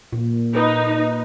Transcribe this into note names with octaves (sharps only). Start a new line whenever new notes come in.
A#2
D#4 B4